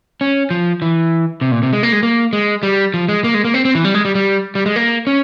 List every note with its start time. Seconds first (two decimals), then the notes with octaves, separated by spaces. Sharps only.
0.21 C#4
0.51 F3
0.82 E3
1.41 C3
1.52 A#2
1.63 C3
1.73 G#3
1.83 A#3
1.92 G#3
2.03 A#3
2.33 G#3
2.63 G3
2.94 F3
3.09 G#3
3.24 A#3
3.34 G#3
3.45 A#3
3.54 C4
3.65 C4
3.75 E3
3.85 G3
3.94 G#3
4.05 G3
4.15 G3
4.55 G3
4.66 G#3
4.76 A#3
5.07 C#4